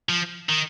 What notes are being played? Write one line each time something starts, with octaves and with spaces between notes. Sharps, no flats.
F3
D#3